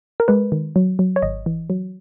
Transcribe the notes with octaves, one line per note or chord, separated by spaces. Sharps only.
A#4
G#3 B4
D#3
F#3
F#3
C#5
G#1 D#5
E3
F#3